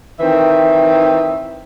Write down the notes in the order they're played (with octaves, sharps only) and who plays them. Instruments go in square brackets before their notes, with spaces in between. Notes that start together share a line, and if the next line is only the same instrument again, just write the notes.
[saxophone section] D#3 E3 C4 E5